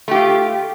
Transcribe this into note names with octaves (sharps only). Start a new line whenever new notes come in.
A3 F4 G4